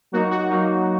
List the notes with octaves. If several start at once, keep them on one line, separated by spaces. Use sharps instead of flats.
F#3 A#3 D#4 F#4
F#4
F#3 A#3 D#4